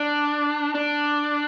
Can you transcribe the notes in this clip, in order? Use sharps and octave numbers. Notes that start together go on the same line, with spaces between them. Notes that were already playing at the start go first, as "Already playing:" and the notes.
Already playing: D4
D4